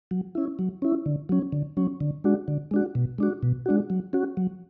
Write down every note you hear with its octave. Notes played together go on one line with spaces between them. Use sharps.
F#3
C#4 E4
F#3
C#4 E4
D3
F#3 C#4
D3
F#3 C#4
D3
G#3 D4 F#4
D3
G#3 D4 F#4
B2
G#3 D4 F#4
B2
G#3 D4 F#4
F#3
C#4 F#4
F#3